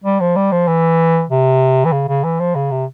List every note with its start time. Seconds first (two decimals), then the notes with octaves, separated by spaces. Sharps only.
0.04 G3
0.20 F3
0.36 G3
0.52 F3
0.67 E3
1.30 C3
1.85 E3
1.92 C#3
2.08 C#3
2.24 E3
2.40 F3
2.55 C#3
2.71 C3